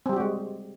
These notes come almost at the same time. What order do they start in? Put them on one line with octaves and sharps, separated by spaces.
C4 G3 G4 F#4 G#3